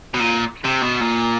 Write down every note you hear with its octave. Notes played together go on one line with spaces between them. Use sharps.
B2
A#2
C3
B2
A#2